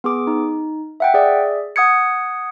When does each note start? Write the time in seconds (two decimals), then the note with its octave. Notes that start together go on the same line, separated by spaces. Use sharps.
0.04 B3 G#4 D6
0.27 D#4
1.00 E5 F#5 G5
1.14 G#4 D5 E5
1.76 F#5 D#6 G#6 C#7